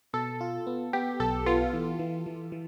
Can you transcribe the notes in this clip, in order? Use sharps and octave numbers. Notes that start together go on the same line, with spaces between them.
B2 A4
F4
B3
B3 G4
B1 A4
B3 F4
E3
E3
E3
E3